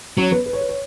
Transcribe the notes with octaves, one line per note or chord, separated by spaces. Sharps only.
F#3 C#4 C#5
B3 B4
B4
C#5
B4
C#5